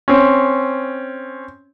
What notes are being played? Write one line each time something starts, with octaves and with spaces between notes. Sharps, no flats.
C4 C#4